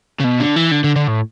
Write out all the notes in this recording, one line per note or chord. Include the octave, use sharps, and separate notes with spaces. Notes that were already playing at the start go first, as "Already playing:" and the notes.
C#3
B2
D3
E3
D3
D3
D3
A2